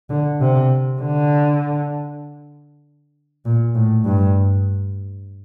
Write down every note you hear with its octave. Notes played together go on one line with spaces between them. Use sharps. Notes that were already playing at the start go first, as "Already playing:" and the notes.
D3
C3
D3
A#2
A2
G2